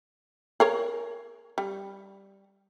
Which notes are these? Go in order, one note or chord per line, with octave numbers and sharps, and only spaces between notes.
G#4 A#4 C#5
G3